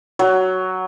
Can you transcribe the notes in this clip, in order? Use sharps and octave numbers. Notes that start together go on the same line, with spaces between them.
F#3